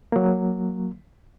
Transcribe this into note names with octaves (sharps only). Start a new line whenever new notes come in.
F#3 A#3